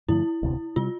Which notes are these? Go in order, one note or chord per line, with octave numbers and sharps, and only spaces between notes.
G2 D3 F3 A3 E4
E1 D2 C3
C3 G3 F4